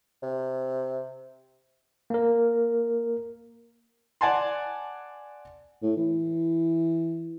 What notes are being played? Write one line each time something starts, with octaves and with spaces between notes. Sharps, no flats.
C3
A#3 A#4
D5 F#5 G#5 A5 C6
A2
E3